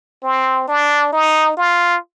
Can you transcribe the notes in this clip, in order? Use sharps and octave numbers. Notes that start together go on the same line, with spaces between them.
C4
D4
D#4
F4